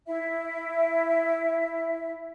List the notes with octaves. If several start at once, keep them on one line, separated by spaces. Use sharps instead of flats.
E4 E5